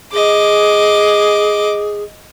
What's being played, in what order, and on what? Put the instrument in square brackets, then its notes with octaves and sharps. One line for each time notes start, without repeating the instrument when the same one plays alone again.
[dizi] G#4 [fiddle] D#5 D6